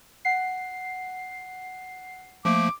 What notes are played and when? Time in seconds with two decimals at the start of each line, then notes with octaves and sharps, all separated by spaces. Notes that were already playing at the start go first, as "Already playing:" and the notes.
0.25 F#5 C7
2.45 F3 A3 A#3 D6